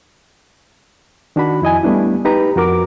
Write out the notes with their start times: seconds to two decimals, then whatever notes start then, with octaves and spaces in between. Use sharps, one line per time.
1.36 D#3 D4 F#4 B5
1.62 F2 E4 D#5 G#5
1.83 G3 A3 B3 D4 E4
2.25 D#4 G4 B4 A#5
2.56 F2 F#4 A#4 D6